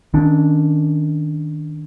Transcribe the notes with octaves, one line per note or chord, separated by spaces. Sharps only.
D#3 C#4 D4